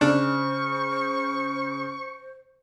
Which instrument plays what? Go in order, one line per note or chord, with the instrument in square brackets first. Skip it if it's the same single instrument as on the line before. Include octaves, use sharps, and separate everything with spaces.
[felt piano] C#3 [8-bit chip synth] D4 [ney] C5 [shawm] C#6